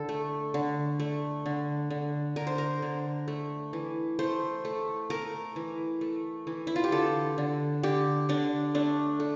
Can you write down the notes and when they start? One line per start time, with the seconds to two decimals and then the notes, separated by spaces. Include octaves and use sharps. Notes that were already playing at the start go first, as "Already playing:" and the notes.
Already playing: D3 A4
0.09 A3
0.54 D3
1.00 A3
1.46 D3
1.90 D3
2.36 D3 A#4
2.47 C5
2.58 A#4
2.82 D3
3.28 A3
3.73 E3
4.19 A3 C5
4.65 A3
5.10 A3 A#4
5.56 E3
6.01 A3
6.47 E3
6.67 E4
6.76 F4
6.84 G4
6.92 D3 A4
7.38 D3
7.83 D3 G4
8.29 D3 D4
8.75 A3 D4
9.20 A3